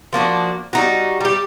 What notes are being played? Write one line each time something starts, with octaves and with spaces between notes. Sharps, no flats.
F3 A#3 D4 F#4
G3 D#4 F#4
G3 G4